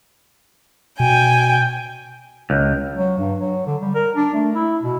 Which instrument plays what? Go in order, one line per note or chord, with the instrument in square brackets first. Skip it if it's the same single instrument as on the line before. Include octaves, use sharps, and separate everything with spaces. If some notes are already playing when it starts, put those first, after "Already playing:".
[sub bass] B2 [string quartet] G5 G#5
[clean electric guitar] C#2
[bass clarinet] F#3
G2
F#3
D3
G3
A#4
D4
A3
E4
B2